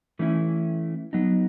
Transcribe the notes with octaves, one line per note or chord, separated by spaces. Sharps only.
E3 A3 C#4 E4
F#3 B3 D#4